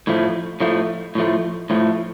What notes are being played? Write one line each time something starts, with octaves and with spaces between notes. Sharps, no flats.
A2 F3 A3
A2 F3 A3
A2 F3 A3
A2 F3 A3